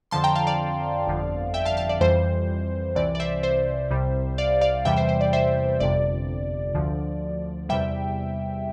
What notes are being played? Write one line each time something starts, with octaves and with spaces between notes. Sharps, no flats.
F2 D3 F3 A5 C6
G5 A#5
F5 A5
D5 F5
G1 F2 D3 F3
E5 G5
F5 A5
F5 A5
D5
F2 E3 G3 C5
C2 C3 E3 D5
D5
C5 E5
C5 E5
C2 C3 G3
D5 F5
D5 F5
E2 C3 E3 G3 E5 G5
C5 E5
C5
D5
C5 E5
G1 F2 C3 D5
D2 D3 F3
E2 C3 G3 E5 G5